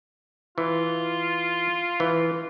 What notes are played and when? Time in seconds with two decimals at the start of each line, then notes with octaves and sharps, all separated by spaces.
0.58 E3 F4
2.00 E3